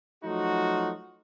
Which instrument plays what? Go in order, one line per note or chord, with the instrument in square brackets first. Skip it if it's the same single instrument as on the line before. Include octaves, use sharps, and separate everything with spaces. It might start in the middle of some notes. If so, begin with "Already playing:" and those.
[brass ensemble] F3 F#3 A3 D#4 F4 F#4